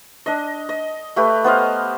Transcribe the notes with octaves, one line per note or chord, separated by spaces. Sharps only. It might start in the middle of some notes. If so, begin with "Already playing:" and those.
D4 D#5
D#5
A3 G4 B4
B3 C5 D#5 F5